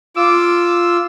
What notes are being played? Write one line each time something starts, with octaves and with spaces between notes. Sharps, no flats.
F4 D6 E6